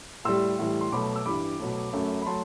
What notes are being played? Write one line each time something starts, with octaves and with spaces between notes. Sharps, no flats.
A2 G3 C6 E6
A2 E3 G3
C6
B2 F#3 A3 B5 D6
E6
G2 E3 G3 B5 D6
B2 F#3 A3
F#2 F#3 A3
B5
F#3 A3 A5 C6